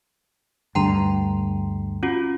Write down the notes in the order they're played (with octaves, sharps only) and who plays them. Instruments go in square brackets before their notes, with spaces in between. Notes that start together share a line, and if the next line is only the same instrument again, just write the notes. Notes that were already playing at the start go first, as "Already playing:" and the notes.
[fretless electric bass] D2 G2 D3 [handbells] G5 A#5 C6
[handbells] C#4 F4 F#4